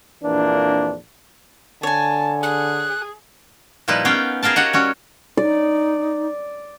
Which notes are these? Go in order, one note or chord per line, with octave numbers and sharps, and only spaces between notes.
A#1 F2 E3 A#3 D4
D3 C#5 G#5 A5
G#4 F#6
A#2 F3 G3 D#4 E4 B4
B3 C#4 F5 G5
G#4 A#4 F5 G5 A5
F#4 G4 C#5 D#5 F#5
G3 C#4 F#4
D#4 D5